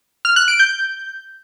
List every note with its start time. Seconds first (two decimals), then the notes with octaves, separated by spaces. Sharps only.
0.25 F6
0.36 F#6
0.48 D7
0.59 G6